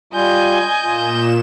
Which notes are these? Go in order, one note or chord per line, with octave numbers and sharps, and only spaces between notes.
G3 F4 D#5 G#5 G6
A#2 F4 E7